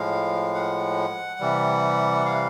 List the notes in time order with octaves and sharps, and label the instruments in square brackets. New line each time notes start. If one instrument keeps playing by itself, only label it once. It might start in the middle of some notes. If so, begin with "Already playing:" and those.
Already playing: [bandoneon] A2 F3 G#3 F5
F#5
C3 E3 G3
F5